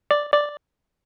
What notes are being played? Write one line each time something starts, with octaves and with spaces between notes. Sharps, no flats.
D5
D5